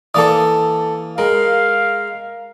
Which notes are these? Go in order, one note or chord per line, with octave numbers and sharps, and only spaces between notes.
E3 A#3 A4 A#4 D5 D#6
G#3 A#4 F5